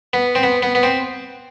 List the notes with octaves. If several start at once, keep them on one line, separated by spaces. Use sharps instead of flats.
B3
C4
B3
B3
B3
C4